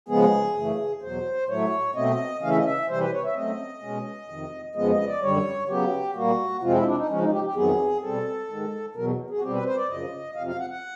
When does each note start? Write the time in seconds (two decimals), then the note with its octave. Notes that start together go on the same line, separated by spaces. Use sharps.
0.08 C#3 F3 G#3 B3 G#4
0.56 F#2 C#3 E3 A3
1.02 E2 B2 F#3 C5
1.49 A2 F#3 A3 C#5
1.95 B2 F#3 A3 C4 D#5
2.42 C#3 E3 A3 C#4 F5
2.49 E5
2.57 D#5
2.64 E5
2.89 C3 E3 G3 C5
3.00 B4
3.12 C#5
3.24 E5
3.36 C#3 F#3 A3 C4 D#5
3.82 B2 G#3 C#4
4.28 F2 C3 D#3
4.75 F2 C#3 F3 G#3 B3 D#5
4.91 D#5
5.06 D5
5.22 F#2 D3 G3 C#5
5.68 C#3 F#3 B3 G4
6.15 A#2 G3 A#3 F#4
6.62 F2 C3 F3 G#3 C4 F4
6.74 E4
6.86 D4
6.97 D#4
7.09 C#3 F3 G#3 C#4
7.20 D#4
7.32 G4
7.44 G4
7.55 F2 C3 D#3 F#3 B3 G#4
8.02 B2 G3 C4 A4
8.49 G#2 D#3 G#3
8.95 E2 B2 F#3 A#4
9.30 G#4
9.38 F#4
9.41 B2 G3 C4 G4
9.53 B4
9.65 C5
9.77 D5
9.88 F#2 C#3 F3 D#5
10.35 F2 C3 F3 F5
10.47 F5
10.59 F#5
10.70 F#5